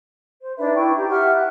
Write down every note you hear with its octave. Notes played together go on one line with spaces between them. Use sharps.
C5
D4 D#4 B4 E5
E4 G5 C#6
G4 A#5
G4 E5 F#5 F6
F#6